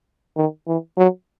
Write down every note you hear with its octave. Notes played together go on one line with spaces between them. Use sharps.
D#3
E3
F#3